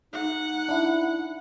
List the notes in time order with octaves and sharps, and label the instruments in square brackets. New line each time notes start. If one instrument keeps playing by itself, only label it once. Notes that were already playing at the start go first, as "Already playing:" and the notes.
[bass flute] D#4 [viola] F#5
[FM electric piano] D4 E4